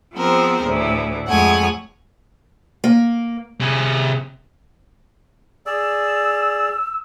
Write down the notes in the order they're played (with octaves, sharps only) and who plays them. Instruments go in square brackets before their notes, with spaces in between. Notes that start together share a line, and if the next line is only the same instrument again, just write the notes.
[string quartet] F3 B3 C4 G#4 A#4 C5
D2 A2 E3
F2 G#3 A3 C#5 F#5 G#5
[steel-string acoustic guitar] A#3
[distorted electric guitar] C3 G#4
[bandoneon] G#4 D5 [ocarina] E6